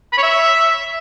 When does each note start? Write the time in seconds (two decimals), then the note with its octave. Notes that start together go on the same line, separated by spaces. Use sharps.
0.13 B5
0.18 C#5
0.23 E5